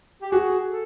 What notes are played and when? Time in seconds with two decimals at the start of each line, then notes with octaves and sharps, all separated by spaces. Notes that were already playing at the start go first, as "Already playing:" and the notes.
0.22 G4
0.31 F#4 G#4
0.69 A4